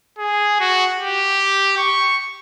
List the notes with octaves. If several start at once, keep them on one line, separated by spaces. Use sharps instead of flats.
G#4
F#4
G4
C#6